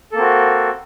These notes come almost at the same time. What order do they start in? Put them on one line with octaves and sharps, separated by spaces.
A4 A#3 C4 F#4